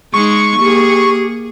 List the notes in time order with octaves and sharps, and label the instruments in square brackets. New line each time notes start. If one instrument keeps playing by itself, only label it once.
[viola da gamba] G#3 D#4 [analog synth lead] C#6
[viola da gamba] A#3 G#4 [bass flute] G4